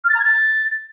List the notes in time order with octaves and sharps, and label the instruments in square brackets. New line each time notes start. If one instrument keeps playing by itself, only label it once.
[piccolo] F6
A6
A#5
G#6
A6